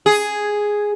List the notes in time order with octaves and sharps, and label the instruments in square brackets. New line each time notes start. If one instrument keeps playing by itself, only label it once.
[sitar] G#4